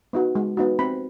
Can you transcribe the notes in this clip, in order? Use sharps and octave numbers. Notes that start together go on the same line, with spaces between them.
B3 D#4 F#4
G#3
B3 D#4 F#4
C4 B5